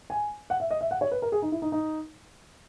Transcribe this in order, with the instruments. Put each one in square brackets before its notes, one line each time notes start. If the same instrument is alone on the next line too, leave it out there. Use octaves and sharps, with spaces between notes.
[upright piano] G#5
F#5
E5
D#5
E5
F#5
C#5
B4
A#4
G#4
D#4
E4
D#4
D#4